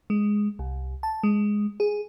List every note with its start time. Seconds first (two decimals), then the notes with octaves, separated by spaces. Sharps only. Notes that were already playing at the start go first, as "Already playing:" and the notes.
0.10 G#3
0.59 C2
1.03 A5
1.23 G#3
1.80 G#4